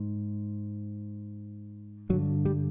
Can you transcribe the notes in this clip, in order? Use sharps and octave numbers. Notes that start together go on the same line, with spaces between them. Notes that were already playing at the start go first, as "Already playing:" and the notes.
Already playing: G#2
G2 D3 F#3
G3